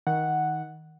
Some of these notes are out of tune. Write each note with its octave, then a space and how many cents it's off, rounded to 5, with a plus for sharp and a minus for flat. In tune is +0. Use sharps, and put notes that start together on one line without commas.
D#3 +20 F#5 +0